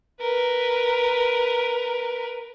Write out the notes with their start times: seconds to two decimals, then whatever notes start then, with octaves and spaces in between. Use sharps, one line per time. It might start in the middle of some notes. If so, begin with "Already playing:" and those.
0.21 A#4 B4